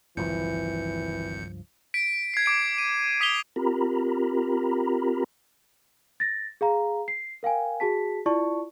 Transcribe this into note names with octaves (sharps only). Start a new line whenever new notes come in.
G#1 C#2 G2 E3 F3 G6 C#7
B6 D7
G#6 C7
D6 D7
D#7
D#6 B6 D7 F7 G7
C4 F4 G4 A#4 A#5 B5
A6 A#6
G#4 F5 A#5
C7
A#4 F5 G5 G#5
F#4 G#4 A5 B6
E4 F4 D5 A5 C#6